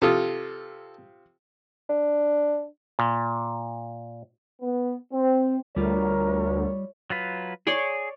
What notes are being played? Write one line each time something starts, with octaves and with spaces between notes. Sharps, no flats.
C3 F4 A4 D#6
D4
A#2
B3
C4
D2 G3 F4 A#4 C#5
F#3 F4 B4
G#4 C#5 D5 C6